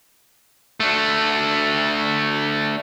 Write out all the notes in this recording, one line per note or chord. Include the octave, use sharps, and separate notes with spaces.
A3 D4